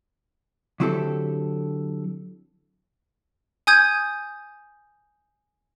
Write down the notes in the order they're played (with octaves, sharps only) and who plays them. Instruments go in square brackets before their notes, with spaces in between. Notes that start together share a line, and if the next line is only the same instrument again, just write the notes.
[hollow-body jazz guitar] D3 F#3 C4 E4 G4 A4
[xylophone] G#5 D#6 G6 G#6 D#7